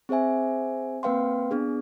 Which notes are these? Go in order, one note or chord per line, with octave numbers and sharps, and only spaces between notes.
C4 G#4 C5 E5 G#5
A#3 C4 B4 F5 G5 C6
B3 D4 G#4